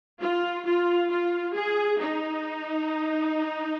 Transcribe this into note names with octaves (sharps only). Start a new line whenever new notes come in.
F4
F4
F4
G#4
D#4